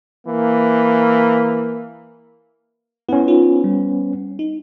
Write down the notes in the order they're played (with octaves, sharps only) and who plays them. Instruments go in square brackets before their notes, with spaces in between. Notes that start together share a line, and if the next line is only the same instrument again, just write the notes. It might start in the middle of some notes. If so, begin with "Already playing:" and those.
[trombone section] E3 A#3
[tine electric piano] B3 C#4 [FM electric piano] E4
[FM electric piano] D#4 F4
G3
D#4